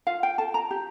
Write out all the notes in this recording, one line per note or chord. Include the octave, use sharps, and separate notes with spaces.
F4 F5
G5
A4 A5
A#5
G4